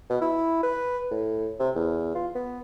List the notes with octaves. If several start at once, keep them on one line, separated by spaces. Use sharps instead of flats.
B2
E4
B4
A2
C3
E2
F4
B3